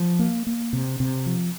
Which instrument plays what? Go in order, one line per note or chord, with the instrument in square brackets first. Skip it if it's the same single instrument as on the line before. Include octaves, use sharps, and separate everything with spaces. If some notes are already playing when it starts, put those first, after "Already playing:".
Already playing: [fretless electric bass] F3
A#3
A#3
C3
C3
F3